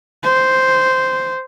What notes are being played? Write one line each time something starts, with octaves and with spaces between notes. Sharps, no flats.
C5